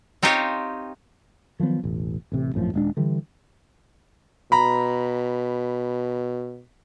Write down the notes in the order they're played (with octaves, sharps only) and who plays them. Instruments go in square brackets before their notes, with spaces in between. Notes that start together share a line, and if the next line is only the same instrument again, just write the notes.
[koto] C4 D#4 F4 G4 C5 C#5
[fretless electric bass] D#3 F3 F#3 B3
E1 A1
A1 C3
G#1 F#2 A2 F3
D#1 G#3 D4
D3 E3 G3
[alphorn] B2 [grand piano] A#5 B5